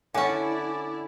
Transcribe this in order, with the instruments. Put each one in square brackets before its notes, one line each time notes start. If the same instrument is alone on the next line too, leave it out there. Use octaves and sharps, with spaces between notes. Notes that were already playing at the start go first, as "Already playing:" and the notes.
[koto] D3 C#4 [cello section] E4 D5 [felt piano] C#5 F#5 G#5 [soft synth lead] D6